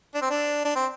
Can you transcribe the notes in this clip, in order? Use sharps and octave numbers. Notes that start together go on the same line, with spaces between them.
D4
C4
D4
D4
C4